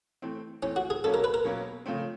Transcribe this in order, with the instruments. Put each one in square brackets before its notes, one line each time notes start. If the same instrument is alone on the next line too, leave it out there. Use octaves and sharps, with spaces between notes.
[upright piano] E3 A3 C4
[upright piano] E3 A3 C4 [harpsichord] C#4
[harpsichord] F#4
G#4
[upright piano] B2 F#3 A#3 C#4 [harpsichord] A4
[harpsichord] A#4
B4
A#4
[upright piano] B2 F#3 A#3 C#4
C#3 F3 A3 C4